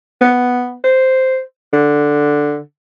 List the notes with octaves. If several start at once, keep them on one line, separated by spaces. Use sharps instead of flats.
B3
C5
D3